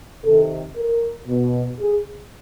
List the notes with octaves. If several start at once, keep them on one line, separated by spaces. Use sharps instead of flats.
C3 D#3 A4
A#4
B2
G#4